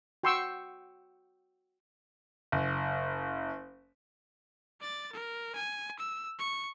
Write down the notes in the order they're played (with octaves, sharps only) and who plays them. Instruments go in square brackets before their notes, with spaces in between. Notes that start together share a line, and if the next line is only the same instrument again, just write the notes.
[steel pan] F#4 G5 C6 C#6 E6
[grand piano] F#1
[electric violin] D5 A6
A#4
G#5
E6
C#6